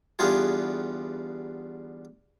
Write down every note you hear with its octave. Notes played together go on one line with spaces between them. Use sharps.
E2 D3 G3 B3 F4 G#4